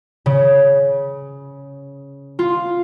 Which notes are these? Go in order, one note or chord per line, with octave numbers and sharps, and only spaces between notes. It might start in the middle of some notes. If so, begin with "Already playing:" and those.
C#3
F4